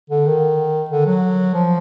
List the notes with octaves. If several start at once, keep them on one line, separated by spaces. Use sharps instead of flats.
D3
D#3
D3
F#3
F3